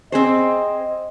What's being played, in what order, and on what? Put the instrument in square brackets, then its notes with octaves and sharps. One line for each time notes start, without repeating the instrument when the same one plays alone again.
[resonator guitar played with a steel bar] C4 G#4 C5 [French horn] D#5